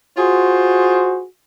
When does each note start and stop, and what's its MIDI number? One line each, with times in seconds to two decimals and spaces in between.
0.17 1.23 65
0.17 1.23 66
0.17 1.23 68
0.17 1.23 72